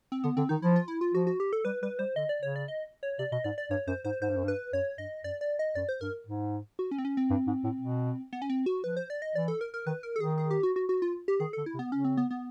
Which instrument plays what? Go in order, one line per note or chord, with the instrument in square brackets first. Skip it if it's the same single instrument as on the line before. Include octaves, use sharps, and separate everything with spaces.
[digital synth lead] C4
[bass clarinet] D3 [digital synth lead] B3
[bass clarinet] D3 [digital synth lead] C4
[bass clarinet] D#3 [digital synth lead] D#4
[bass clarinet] F3 [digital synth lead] E4
[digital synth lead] F4
E4
F4
[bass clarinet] F3 [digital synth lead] F#4
[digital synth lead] F#4
G4
A4
[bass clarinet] G3 [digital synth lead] B4
[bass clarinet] G3 [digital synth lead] B4
[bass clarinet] G3 [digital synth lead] C5
[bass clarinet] D3 [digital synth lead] D#5
[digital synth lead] D5
[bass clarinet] C#3 [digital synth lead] C#5
[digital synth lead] D5
D#5
C#5
[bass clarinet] C3 [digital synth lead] D5
[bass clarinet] B2 [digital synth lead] D#5
[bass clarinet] G#2 [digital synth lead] D5
[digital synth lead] D5
[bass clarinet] G2 [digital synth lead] C#5
[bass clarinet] F#2 [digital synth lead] C5
[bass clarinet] G#2 [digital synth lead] C5
[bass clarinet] G#2 [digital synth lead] C5
[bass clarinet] G2
F#2
G2
[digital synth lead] B4
[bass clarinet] F#2 [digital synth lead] C#5
[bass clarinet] G2 [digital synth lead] D#5
[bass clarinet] F#2 [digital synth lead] D5
[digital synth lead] D5
D#5
[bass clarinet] F#2 [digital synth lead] D5
[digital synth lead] C5
[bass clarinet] G2 [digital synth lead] A#4
[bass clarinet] G#2
[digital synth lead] F#4
C#4
C4
C#4
C4
[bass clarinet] G2
G#2
A2
B2
[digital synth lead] B3
C#4
C4
F#4
[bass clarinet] F3 [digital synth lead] B4
[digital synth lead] C5
D5
D#5
[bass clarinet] E3 [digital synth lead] D5
[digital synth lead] A4
A#4
A#4
[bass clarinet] D#3 [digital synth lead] B4
[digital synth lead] A#4
A4
[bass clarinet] D#3 [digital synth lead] G#4
[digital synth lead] G#4
G4
F#4
F#4
F#4
F4
G4
[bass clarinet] D#3 [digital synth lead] G#4
[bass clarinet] D3 [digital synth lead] A4
[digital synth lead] E4
[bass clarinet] C3
[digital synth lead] B3
[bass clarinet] C#3 [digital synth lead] C#4
[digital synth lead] C4
B3
B3